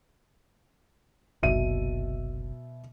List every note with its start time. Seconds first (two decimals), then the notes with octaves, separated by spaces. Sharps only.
1.43 F#1 C2 B2 E5 D#7